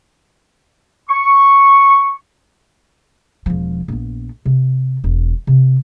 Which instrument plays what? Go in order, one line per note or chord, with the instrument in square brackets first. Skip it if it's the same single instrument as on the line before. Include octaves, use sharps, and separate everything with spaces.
[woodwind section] C#6
[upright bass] E1 F3
A#1 B3
C3
E1
C3